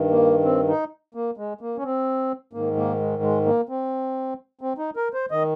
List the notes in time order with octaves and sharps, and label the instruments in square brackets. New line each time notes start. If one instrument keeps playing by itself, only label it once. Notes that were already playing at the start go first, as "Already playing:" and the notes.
Already playing: [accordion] G2 D#3
A#3
C4
D#4
A#3
G#3
A#3
C#4
C4
G#2 D#3 A#3
A#3
G#3
G#3
A#3
C4
C4
D#4
A#4
C5
D#3 D#5